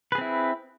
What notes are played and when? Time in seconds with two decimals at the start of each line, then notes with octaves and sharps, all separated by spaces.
0.12 B4
0.15 G#4
0.18 C4
0.21 E4